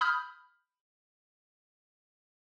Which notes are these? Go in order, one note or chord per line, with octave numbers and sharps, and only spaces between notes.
B5 D#6 F6 G6